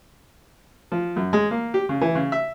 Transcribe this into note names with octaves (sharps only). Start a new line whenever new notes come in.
F3
F#2
G#3
A#3
G4
C#3
E3
C#3
E5